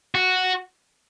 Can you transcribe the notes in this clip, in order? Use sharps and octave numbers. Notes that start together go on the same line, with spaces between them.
F#4